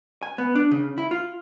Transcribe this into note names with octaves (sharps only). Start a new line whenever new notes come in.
G#5
B3
D4
C#3
E4
F4